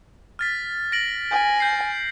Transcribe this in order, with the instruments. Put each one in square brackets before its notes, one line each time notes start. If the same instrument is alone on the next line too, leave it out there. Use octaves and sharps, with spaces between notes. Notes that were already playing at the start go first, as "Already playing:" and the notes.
[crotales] F6 A6 B6
A#6 D7 F#7
[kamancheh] G#5
[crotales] G6 C7